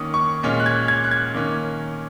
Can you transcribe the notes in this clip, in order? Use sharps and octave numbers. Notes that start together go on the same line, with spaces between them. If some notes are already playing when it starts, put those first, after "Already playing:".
Already playing: D#3 A#3 C#4 D#6
C#6
A#2 G#3 C#4
F#6
G#6
G#6
F#6
G#6
D#3 A#3 C#4